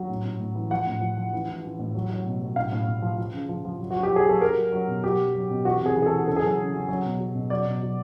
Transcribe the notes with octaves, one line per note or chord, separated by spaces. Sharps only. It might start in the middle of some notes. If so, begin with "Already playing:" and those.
Already playing: F#3
A2
A2
A2
E3
F3 F#5
A2
F3
F3
E3
E3
E3
A2
F#3
F#3
B2
F#3
A2 F5
A2
A2
F3
F3
C#3
F3
F3
F#3
F#3 F#4
G4
F#3
G#4
F#3 A4
F#3 A#4
F#3
F#3
B2
F#3 G4
F#3
F#3
B2
E3 F#4
C3 G#4
E3
G#4
A4
E3
C#3 A4
G#4
F#3 A4
C#3
F#3
F#3
B2
F#3
B2
F#3 D5
B2
F#3